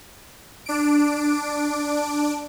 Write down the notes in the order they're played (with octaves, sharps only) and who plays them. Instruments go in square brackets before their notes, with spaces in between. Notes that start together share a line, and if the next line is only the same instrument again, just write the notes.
[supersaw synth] D4 D7